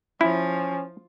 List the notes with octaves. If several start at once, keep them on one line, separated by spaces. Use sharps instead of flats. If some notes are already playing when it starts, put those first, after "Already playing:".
F3 C#4 E4